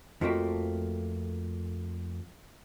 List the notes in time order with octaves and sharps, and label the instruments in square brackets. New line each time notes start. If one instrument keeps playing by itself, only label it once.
[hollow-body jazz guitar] F2 F3 A3 A#3 F#4 G5